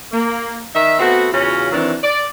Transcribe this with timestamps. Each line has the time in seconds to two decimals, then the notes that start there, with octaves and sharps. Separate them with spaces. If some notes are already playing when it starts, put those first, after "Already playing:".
0.12 A#3
0.73 D#3 D#4 E5
0.99 A3 B3 C4 F#4
1.32 E2 C#3 C#4 F4 F#4
1.71 D#3 E3 F#3 C4 D4
2.03 D5